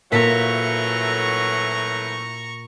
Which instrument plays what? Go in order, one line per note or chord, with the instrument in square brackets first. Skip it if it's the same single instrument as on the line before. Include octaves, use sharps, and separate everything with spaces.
[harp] A#2 B6 [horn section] E3 F#3 A3 [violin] A#5 C#6